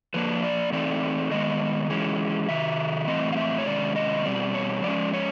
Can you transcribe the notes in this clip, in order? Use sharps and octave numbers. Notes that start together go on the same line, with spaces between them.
F3 A#3 D4 B4
D5
E3 A3 C4 D#4 D5
D#3 G#3 B3 D#5
E3 G#3 C#4
C3 D#3 E5
A2 E3 A3 C4 D#5
F5
E5
C#5
C3 D#3 G#3 C#4 D5
D#5
B2 G3 C4 D5
C#5
F3 G#3 C#4 D5
C#5